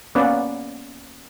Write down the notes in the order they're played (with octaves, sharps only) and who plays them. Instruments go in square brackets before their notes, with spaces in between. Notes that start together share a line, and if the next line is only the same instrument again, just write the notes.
[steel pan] A#3 B3 C#4 D5 F#5